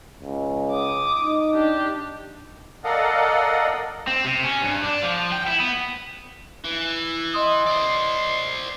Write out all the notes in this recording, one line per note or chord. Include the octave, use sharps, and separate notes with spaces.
C#2
D6 D#6
D#4
D4 G4
A4 A#4 D5 D#5 F5 F#5
C4
C3
C#4
G2
D4
F3
G5
E4
B3
E3
D#5 C6 D#6
C5 D5